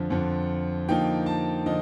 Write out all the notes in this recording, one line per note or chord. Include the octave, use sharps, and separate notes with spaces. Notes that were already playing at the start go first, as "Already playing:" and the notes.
Already playing: F2 D3 F3
F2 D3 F3
D3 F3 A#3 D#4 G5
A5
D3 F3 D#5